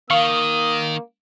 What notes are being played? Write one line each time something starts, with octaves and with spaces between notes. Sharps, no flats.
D#3 A#3 F5 C#6 D#6